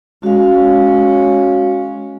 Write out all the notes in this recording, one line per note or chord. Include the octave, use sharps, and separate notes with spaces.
G#3 C#4 F#4 F5